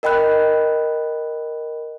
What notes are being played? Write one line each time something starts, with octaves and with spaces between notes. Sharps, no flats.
A#4 D#5 G5 B5 F#6